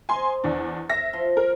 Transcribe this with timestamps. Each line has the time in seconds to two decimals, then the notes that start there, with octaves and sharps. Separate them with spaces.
0.09 C5 D#5 G#5 A#5 C6
0.44 E2 D4
0.90 E5 A#6
1.13 F3 F4 C6
1.37 A#4